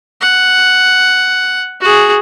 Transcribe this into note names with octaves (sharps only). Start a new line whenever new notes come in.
F#5
F#4 G#4